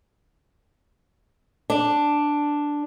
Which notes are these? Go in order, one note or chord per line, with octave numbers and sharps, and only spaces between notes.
D4